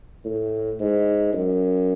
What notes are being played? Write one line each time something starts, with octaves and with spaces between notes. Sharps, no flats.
A2
G#2
F#2